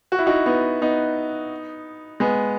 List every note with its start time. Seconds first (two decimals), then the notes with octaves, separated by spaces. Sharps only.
0.12 F#4
0.19 E4
0.26 D#4 F#4
0.46 B3 D#4
0.82 B3 D#4
2.20 G#3 B3